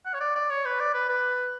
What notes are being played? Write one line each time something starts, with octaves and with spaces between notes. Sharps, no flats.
F#5
C#5
D5
D5
C#5
B4
D5
B4
B4